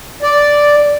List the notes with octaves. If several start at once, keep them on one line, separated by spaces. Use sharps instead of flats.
D5